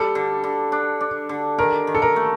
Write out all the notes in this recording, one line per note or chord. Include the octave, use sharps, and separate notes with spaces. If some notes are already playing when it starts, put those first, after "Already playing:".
Already playing: G3 A4
D3
D3
D4
D4
D3
D#3 A#4
D#3
A4
A#4
A3